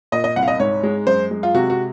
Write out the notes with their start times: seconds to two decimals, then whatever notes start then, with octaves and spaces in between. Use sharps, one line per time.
0.12 A#2 D#5
0.24 D#5
0.36 C2 F#5
0.43 F5
0.48 D#5
0.60 G#2 C#5
0.83 G#3
1.07 F#2 C5
1.31 G#3
1.43 F4
1.54 C3 F#4
1.70 F#4